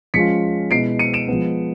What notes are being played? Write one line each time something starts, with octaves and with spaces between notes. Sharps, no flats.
F3 G#3 C#4 F4 B6 C#7
B2 G#3 B3 E4 C7 D7
C#7 D#7
D7 E7
F3 G#3 B3